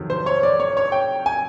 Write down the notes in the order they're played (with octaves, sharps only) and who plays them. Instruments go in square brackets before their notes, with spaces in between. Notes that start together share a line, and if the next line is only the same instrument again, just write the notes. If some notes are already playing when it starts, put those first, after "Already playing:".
Already playing: [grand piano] F2 C3 D#3 F#3
C5
C#5
D5
C#5
C#5
G5
G#5